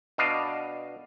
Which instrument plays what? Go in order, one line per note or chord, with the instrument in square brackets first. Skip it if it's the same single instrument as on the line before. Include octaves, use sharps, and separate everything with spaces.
[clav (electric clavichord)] B2 D4 D#5 F5